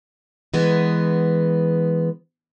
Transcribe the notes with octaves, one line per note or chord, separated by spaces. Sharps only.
E3 G#3 B3